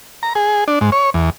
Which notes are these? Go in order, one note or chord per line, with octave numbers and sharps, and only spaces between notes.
A#5
G#4
D4
G#2
C#5
E2